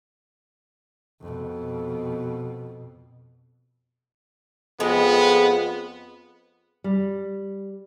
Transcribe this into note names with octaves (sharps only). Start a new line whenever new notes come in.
F2 B2
F2 G#3 B3
G3